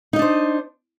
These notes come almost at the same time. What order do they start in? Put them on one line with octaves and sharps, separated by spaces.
D#4 D#5 D4 C5